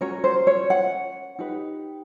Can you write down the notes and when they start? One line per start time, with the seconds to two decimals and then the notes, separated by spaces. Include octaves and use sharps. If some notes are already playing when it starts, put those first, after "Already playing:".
0.01 C#4 F#4 A#4 C#5
0.24 C5
0.47 C#5
0.70 F#5
1.39 D#4 G4 B4